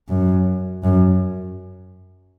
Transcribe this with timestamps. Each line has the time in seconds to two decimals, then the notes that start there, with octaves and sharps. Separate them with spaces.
0.09 F#2
0.84 F#2